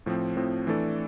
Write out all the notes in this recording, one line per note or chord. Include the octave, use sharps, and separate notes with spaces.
A2 F3 C4
A2 F3 C4
E3 A3 D4 A4 D5